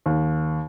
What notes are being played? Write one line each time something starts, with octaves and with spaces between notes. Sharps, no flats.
D#2